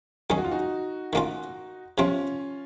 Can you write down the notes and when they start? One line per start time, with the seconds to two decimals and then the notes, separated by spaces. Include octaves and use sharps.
0.30 D#3 F#3 C#4 G#4
0.38 F#4
0.45 F4
0.51 D#4 F#4
1.13 D#3 A#3 C#4 F4
1.98 C3 F3 C4 C#4 F4